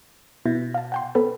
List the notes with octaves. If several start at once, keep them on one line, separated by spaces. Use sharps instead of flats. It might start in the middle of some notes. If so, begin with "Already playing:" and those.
B2 E4
F5 A5
F#5 G5 C6
B3 A4 B4